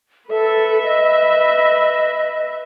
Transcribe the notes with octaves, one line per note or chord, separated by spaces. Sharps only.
A4 B4 E5
D#5